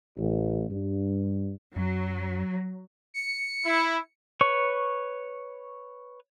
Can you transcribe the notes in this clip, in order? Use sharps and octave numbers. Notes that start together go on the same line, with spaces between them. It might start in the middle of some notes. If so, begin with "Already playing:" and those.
A1
G2
F#2 F#3
C#7
E4
B4 C#5 C#6